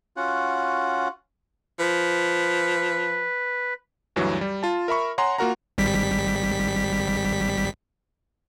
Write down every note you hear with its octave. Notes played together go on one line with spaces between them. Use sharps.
C#4 F4 F#4 F#5
F3 B4
D2 G2 E3 F#3
G3
F4 A5
A#4 E5 B5 C#6
C#5 F#5 G#5 A#5 C6
A#3 F4 F#4 A#4 F#5 A#5
G#1 G3 B6